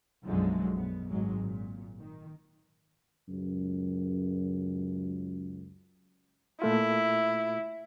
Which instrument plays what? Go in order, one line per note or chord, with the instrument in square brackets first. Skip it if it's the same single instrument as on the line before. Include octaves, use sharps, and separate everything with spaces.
[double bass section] B1 F#2 D3 F3 F#3 G#3
B2 B3
G#1 F#3 G#3
A#2
D#3
[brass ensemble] C#2 F#2
[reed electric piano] A#2 A3 F4 [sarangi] E4